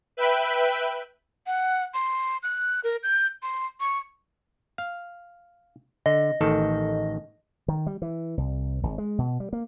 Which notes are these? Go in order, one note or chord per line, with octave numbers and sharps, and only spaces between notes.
B4 E5 G5 B5
F#5
C6
F#6
A#4
G6
C6
C#6
F5
D3 D#5
A1 D#3 A4
D#3
G3
E3
C2
G#1
G#3
B2
G3
A#3